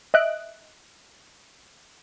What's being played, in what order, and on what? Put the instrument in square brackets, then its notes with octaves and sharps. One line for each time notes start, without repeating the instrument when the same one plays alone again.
[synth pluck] D#5 E5 F#6 D7